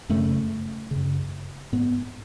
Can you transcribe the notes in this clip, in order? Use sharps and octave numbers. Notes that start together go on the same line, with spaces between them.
F#2 C#3 A3
F#2 C#3
G#2 B3